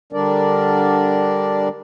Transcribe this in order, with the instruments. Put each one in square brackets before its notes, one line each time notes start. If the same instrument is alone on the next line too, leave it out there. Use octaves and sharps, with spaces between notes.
[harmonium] D3 G3 D4 A#4 D5